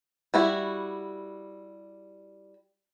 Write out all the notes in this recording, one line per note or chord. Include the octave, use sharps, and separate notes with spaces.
G3 E4 F#4